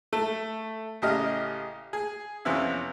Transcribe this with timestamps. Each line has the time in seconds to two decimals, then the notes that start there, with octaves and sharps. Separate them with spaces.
0.13 A3
1.02 A1 C#3 G4 D#5 F6
1.93 G#4
2.45 F2 C3 E3 B3 C#4 E4